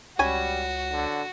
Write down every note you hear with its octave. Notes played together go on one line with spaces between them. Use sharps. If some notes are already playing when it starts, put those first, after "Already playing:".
C#2 G3 C#4 F#4 G#5 B5
D3